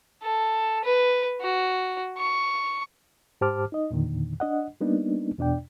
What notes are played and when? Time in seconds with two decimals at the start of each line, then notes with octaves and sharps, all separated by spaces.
0.23 A4
0.84 B4
1.41 F#4
2.18 C#6
3.41 G#2 G4 C5 A5 D6 F6
3.72 D#4 D#5
3.91 E2 A#2 D3 D#3
4.40 D4 D#5 F#5
4.81 G3 A#3 B3 D4 D#4
5.38 E2 B2 D4 D5 G5